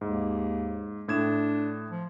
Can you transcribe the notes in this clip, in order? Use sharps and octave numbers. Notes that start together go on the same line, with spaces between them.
D#2 G#2
A2 D4 G#6 E7
F3